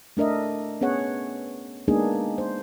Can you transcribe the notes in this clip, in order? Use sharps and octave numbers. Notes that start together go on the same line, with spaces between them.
A3 D4 A#4 D#5 E5
B3 C#4 G#4 C#5 F#5
G#3 A#3 B3 D4 D#4 G#4
C5